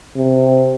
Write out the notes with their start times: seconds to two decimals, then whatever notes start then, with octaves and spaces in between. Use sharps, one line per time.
0.17 C3